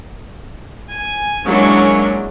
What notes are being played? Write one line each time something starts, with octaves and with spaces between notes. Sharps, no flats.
G#5
F#3 G#3 A#3 C#4 D4 E4